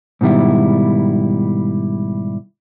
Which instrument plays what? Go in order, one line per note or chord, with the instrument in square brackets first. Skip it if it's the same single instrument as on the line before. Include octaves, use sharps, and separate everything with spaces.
[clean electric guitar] G#2 B2 D#3 G3 E4